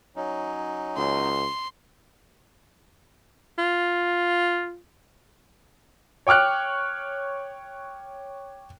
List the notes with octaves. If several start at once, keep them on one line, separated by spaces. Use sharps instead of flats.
F#3 C#4 D#4
C#2 C6
F4
C#5 G5 D6 F6 F#6